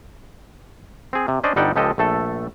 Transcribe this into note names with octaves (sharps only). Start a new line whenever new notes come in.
C4 G#4
C3
C#4 D4 C5 D5 D#5
G1 G3 D#4 F#5 G5 A5
C#2 F3 G#3 G4 A4 D#5
A#1 A3 A4